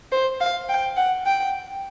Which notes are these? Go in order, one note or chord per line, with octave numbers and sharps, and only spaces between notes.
C5
F5
G5
F#5
G5